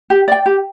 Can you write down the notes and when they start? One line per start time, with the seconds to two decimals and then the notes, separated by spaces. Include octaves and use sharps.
0.10 G4
0.28 D5 G5
0.46 G4